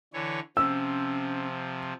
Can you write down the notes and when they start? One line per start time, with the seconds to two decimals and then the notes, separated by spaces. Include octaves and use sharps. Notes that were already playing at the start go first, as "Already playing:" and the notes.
0.13 D3 E3 C#5
0.57 C3 F3 C#4 E6